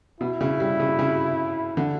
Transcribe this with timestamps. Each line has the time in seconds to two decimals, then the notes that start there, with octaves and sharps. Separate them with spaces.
0.21 B2 E4
0.41 C#3
0.60 G3
0.80 C#3
0.99 C#3
1.77 D3